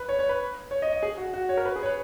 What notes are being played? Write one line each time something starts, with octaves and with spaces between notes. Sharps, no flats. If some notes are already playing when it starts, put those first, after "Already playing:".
Already playing: B4
C#5
C#5
B4
C#5
D#5
D#5
G#4
F#4
F#4
C#5
A#4
B4
G#4
C#5
B4